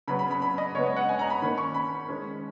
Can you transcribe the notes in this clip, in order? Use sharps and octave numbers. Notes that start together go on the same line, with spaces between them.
C#3 F#3 B3 B5
B5
B5
B5
D#5
C#3 G#3 B3 C#5
D#5
F#5
G#5
A#5
B5
D#3 A#3 C#4 B5
C#6
B5
D#3 G#3 C#4